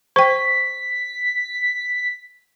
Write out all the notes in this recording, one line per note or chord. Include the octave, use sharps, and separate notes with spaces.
C5 G5 C#6 B6